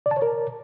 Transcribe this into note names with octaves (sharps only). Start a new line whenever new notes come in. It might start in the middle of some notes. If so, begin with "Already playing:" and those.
D5
A5
C#5
A#4